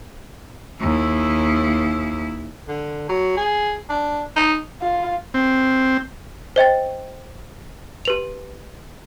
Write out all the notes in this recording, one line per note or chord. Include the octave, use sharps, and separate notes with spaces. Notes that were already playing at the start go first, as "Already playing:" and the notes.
D#2 E4
D3
F#3
G#4
D4
D#4
F4
C4
C5 D#5 G5 A6
G4 B4 F7